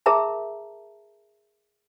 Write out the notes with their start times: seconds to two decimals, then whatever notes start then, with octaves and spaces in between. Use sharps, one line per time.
0.06 G#4 A#4 E5 A5 A#5